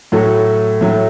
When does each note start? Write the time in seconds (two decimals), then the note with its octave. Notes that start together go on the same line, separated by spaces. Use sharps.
0.12 A2 F#3 A3 F#4 A4
0.81 A2 F#3 A3